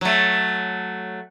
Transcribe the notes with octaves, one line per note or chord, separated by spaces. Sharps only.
F#3 A3